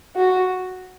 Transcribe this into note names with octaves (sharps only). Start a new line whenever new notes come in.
F#4